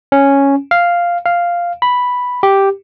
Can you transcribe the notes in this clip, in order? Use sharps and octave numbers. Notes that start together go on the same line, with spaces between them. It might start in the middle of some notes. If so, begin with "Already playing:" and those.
C#4
F5
F5
B5
G4